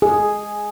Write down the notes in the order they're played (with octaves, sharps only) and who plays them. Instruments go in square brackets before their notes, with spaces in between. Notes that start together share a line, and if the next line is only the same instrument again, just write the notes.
[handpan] G#4